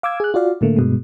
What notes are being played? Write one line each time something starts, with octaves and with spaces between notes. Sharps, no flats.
F5 D6 E6 G#6
G#4 F#6
F4 F#4 D5 F5
A2 D3 A3 A#3
G2 B2 G#3